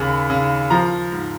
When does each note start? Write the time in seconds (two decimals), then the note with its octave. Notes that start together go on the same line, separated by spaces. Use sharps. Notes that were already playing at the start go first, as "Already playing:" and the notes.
Already playing: D#2 C#3 B5
0.30 C#3
0.70 F3 A#5
1.12 G#2